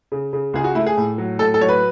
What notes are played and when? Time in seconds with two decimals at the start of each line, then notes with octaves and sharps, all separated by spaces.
0.12 C#3
0.33 C#3
0.54 C#2 G#4
0.64 F#4
0.75 A3 E4
0.86 G#4
0.97 A2
1.18 F#3
1.39 A2 A4
1.54 A4
1.61 F#3 C#5
1.69 B4